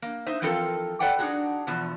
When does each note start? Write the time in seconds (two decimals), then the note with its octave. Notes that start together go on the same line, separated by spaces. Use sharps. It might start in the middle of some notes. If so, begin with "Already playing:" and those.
0.02 A#3
0.26 D#4 C5 E5
0.41 E3 F3 C4 F4 A4 A#4
1.00 A4 B4 D5 F#5 G5
1.19 D4 D#4 F#4 G#4
1.67 E2 B2 F3